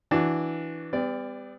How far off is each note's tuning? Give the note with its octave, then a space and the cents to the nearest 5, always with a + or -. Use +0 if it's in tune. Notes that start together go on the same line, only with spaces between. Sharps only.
E3 +0 D4 +0 F#4 +0
G3 +25 B3 +40 D5 +0